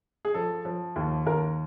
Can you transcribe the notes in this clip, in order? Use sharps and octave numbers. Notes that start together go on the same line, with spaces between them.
G#4
F3 A4
F3
D#2
D#2 A#4